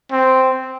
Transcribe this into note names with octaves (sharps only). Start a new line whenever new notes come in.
C4